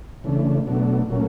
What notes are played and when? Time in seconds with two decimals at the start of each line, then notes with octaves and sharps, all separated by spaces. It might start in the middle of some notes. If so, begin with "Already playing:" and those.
0.24 C#3 E3 A3 D4
0.66 B2 F#3 A3 D4
1.08 A#2 F#3 A3 C#4